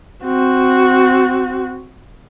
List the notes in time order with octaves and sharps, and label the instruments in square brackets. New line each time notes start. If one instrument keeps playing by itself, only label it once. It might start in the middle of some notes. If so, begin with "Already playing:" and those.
[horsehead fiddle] C4 F#4